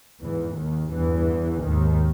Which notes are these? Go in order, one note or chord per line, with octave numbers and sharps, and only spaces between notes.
E2 G#2 E3
D#2 D#3
E2 G2 E3
D#2 G#2 D#3